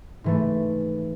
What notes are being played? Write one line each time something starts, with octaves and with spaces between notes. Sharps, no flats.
G#2 E3 A3